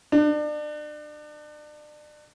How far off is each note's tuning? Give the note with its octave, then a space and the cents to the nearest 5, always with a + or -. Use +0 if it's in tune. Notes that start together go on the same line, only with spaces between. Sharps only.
D4 +35